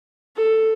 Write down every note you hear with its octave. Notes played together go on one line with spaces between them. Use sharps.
A4